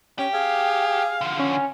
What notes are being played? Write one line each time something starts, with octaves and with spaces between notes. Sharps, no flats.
C#4 G4
G#4 F5
D3 F3
C#4